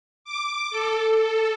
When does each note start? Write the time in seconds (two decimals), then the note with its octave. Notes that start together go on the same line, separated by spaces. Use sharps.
0.25 D6
0.71 A4
1.17 A4